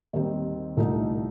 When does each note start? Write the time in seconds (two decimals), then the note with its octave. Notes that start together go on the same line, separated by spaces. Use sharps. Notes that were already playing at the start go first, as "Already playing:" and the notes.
0.13 D#2 D#3 G3 C4
0.77 C2 A#2 A3 D#4